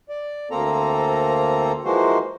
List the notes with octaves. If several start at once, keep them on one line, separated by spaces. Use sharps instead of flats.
D5
D2 A#3 C4 A4 A#5
E3 F3 G#3 A#3 F#4 C5